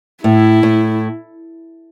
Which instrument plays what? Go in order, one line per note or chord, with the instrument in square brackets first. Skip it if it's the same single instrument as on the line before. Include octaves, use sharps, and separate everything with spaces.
[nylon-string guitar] A2 [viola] E4
[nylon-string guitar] A2